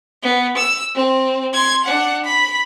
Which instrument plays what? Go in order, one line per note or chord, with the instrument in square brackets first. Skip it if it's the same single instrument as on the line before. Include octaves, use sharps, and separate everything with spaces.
[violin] B3
E6
C4
C6 G#6
D4 F#5
B5